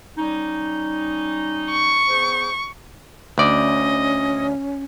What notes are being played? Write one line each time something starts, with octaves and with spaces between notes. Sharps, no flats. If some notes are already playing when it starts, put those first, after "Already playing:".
G3 C#4 D#4
C#6
B3 G#4 C5
D2 C#4 D5 D#5